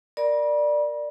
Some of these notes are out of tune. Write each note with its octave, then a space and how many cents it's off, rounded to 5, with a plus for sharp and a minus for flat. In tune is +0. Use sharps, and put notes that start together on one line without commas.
A#4 +0 D5 +10 B5 -40